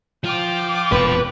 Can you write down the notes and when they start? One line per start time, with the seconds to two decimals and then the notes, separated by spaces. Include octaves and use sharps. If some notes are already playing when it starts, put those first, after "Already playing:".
0.24 F3 F4 G5 D6
0.92 E1 F2 A#2 B4